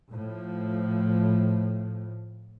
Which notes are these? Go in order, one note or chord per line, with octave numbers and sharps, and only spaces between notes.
A2 F3